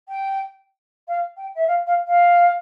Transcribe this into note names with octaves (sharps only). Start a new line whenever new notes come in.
G5
F5
G5
E5
F5
F5
F5